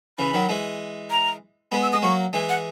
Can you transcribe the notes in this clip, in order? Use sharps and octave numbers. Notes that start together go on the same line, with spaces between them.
C#3 E3 B5
D#3 F#3
E3 G#3
A#5
G#3 B3 B5
E6
G#3 D#6
F#3 A#3 C#6
E3 G#3 G#5
F#5